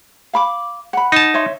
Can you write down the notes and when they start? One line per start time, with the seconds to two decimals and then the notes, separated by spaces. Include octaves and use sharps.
0.33 F5 B5 D6
0.93 F#5 B5
1.12 D#4 A5
1.34 C#5 E5 C6